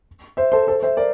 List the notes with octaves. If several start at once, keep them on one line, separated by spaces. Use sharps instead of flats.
C5 E5
A4 C5
A4 C5
C5 E5
A#4 D5